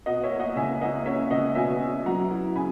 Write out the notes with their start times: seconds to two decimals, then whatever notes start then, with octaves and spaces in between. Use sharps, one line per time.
0.06 B2 D#5 F#5
0.24 C#5 E5
0.31 A#3
0.39 D#5 F#5
0.56 C#2 E5 G#5
0.81 A#3 D#5 F#5
1.06 C#4 C#5 E5
1.30 C#2 D#5 F#5
1.55 B2 E5 G#5
1.80 C#4
2.05 F#3 F#5 A#5
2.31 E4
2.56 C#3 G#5 B5